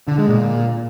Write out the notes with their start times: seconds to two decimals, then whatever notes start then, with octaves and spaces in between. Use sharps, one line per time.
0.08 D3
0.18 G#3
0.29 A#2